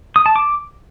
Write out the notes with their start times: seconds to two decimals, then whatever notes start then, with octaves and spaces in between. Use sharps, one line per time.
0.16 D#6
0.26 A5
0.36 D6